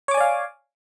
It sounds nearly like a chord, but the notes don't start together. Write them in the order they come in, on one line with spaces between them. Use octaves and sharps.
C#5 D6 G#5 D5 F5